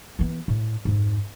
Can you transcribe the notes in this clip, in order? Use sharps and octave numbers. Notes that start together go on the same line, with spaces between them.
E3 B3
A2
F2 G#2